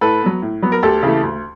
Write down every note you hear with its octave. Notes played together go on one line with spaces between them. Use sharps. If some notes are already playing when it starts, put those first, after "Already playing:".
A2 A4 B4
F#3 B3
A2
F#3 B3
A#4
D2 G4 A4
C#3 E3 A3
D2